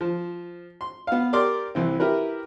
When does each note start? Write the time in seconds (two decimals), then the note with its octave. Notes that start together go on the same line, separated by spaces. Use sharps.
0.01 F3
0.81 C6
1.07 B3 F5
1.33 G4 A#4 D5 C6 D6
1.75 C2 E3 C4
2.00 E4 G4 A#4 B4